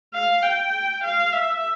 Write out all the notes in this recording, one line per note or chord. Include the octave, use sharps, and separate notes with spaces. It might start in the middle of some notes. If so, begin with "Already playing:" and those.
F5
G5
F5
E5